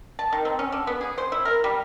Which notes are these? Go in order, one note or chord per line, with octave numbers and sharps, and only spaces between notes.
A5
D#3
C4
C#4
D3
B3
G#4
C5
E4
A#4
G3